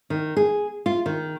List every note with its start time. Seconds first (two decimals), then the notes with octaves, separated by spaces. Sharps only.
0.10 D#3
0.37 G#4
0.86 F4
1.06 D#3